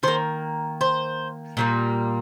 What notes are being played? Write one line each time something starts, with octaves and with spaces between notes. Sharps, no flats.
D#3 A#3 C5
C5
A#2 G3 A#3